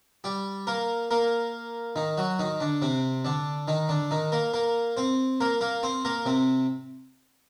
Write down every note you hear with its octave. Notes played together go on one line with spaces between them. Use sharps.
G3 G4
A#3 A#4
A#3 A#4
D#3 D#4
F#3 F#4
D#3 D#4
D3 D4
C3 C4
D3 D4
D#3 D#4
D3 D4
D#3 D#4
A#3 A#4
A#3 A#4
C4 C5
A#3 A#4
A#3 A#4
C4 C5
A#3 A#4
C3 C4